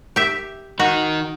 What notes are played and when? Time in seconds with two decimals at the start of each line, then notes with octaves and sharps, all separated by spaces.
0.16 G4 E5
0.80 D#3 D#4 F#4